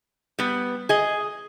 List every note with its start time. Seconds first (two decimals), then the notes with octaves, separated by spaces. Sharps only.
0.39 G3 B3
0.89 G#4 D#5